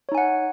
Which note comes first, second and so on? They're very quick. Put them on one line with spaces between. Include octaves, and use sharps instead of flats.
C#5 D#4 G#5 F#5